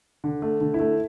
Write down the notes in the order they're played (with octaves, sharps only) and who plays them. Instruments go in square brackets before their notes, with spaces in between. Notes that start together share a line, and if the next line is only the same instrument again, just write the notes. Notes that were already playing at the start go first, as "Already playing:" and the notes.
[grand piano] D3
A3
D3
E4
A3